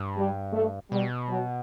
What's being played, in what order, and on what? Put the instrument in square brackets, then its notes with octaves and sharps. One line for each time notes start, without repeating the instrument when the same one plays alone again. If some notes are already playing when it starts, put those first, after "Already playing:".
Already playing: [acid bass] G2
[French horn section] G3
A3
[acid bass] B2 [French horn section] G3
[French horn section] F#3